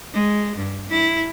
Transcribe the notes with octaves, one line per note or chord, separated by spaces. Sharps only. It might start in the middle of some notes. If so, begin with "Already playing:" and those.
G#3
G2
E4